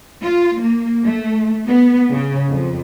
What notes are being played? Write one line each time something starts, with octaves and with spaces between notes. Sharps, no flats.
F4
A#3
A3
B3
C#3
F2